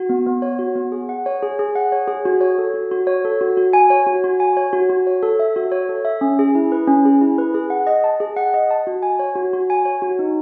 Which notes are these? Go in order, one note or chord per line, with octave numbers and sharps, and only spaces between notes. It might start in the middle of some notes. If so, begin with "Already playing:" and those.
Already playing: F#4
B3
B3
C#5
F#4
B3
G#4
F#5
C#5
G#4
G#4
F#5
C#5
G#4
F#4
C#5
A4
F#4
F#4
C#5
A4
F#4
F#4
G#5
C#5
F#4
F#4
G#5
C#5
F#4
F#4
C#5
A4
E5
F#4
C#5
A4
E5
C#4
G#4
E4
B4
C#4
G#4
E4
B4
G#4
F#5
D#5
A5
G#4
F#5
D#5
A5
F#4
G#5
C#5
F#4
F#4
G#5
C#5
F#4
D#4